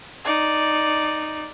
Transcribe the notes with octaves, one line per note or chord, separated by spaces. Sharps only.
D#4 D5